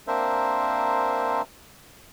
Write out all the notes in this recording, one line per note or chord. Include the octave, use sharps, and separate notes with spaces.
A#3 C4 D4 A#4 C5 E5